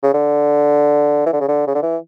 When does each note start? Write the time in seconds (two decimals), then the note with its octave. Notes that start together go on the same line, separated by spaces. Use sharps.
0.03 C#3
0.14 D3
1.26 E3
1.33 D3
1.40 C#3
1.48 D3
1.67 C#3
1.75 D3
1.83 E3